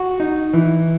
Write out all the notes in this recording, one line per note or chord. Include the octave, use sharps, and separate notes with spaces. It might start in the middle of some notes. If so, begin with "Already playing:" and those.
Already playing: F#4
D#4
E3